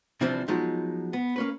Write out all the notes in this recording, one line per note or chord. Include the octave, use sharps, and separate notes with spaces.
C3 E3 F3 G3 C4 D4
F3 F#3 G#3 B3 D#4
B3
A#3 C#4 B4